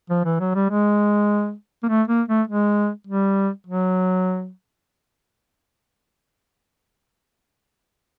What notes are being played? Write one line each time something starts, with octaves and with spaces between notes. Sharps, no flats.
F3
E3
F#3
G3
G#3
A#3
A3
A#3
A3
G#3
G3
F#3